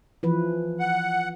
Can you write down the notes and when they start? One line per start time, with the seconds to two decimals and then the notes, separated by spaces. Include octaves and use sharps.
0.23 E3 F3 B4
0.80 F#5